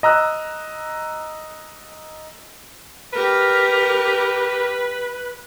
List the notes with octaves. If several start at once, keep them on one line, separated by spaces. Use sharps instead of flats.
D#5 A#5 E6 F#6
G4 A#4 B4